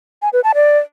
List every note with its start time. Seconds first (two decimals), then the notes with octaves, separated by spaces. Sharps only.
0.22 G#5
0.33 B4
0.44 A5
0.55 D5